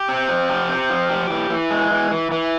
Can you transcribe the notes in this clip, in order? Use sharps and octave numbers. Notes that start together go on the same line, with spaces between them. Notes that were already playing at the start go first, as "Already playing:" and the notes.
Already playing: G4
C4
F3
G4
C4
F3
G4
E3
E3
G#3
E3
E3
E3